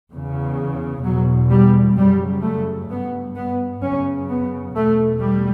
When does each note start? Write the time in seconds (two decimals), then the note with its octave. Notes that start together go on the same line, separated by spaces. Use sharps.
0.11 E2 C#3
1.03 E2 B2 F#3
1.50 G3
1.96 F#2 C#3 G3
2.42 A3
2.89 G2 B3
3.36 B3
3.82 F#2 C#3 C#4
4.29 B3
4.75 E2 B2 A3
5.21 G3